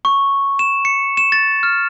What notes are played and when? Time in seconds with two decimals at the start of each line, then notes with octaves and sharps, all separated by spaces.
0.05 C#6
0.59 E7
0.85 C#7
1.17 E7
1.32 A6
1.63 F6